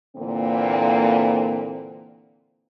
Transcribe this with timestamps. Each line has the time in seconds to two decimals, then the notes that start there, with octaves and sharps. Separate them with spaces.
0.16 A#2 D3 E3 A#3 C4